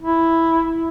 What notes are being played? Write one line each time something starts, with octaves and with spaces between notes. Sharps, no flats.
E4